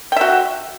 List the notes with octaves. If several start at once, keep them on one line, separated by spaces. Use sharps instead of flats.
F#4 E5 G5